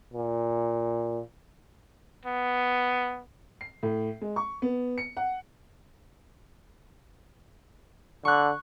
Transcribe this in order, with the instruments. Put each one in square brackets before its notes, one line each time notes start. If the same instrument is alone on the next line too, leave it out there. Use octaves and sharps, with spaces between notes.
[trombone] A#2
[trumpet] B3
[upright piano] C7
A2
G#3
C#6
B3
C#7
F#5
[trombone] D3 [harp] C#6 F#6